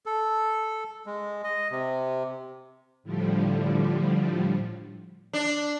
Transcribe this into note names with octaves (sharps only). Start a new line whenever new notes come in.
A4
G#3
D#5
C3
A2 D3 F3 G3
D4